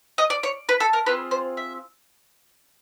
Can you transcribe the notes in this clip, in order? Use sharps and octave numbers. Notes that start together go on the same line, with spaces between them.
D#5
D5
C#5
B4
A4
A#4
C4 F4 G#4 B4
C5
E5